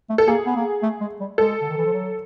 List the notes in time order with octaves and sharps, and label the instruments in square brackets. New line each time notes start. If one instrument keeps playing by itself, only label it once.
[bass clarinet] A3
[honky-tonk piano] A4
[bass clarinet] A#3 [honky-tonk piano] G#4
[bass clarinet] B3
A#3
A3
G#3
G3
[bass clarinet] G#3 [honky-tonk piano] A4
[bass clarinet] D3
D#3
E3
F3
F#3